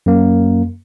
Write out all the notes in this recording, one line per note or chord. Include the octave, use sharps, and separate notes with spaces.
F#2 A#3